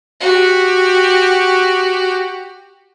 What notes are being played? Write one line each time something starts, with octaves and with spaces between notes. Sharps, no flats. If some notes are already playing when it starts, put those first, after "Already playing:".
F#4 G4